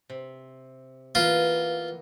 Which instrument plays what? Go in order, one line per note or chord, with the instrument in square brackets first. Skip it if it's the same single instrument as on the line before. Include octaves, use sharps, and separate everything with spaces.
[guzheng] C3
[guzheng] E3 A#3 B3 [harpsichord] F4